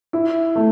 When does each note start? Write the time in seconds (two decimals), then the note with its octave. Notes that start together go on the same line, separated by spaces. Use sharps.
0.13 E4
0.56 A3